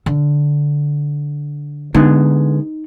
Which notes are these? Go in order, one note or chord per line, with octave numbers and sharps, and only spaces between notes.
D3
D3 G#3 B3 D#4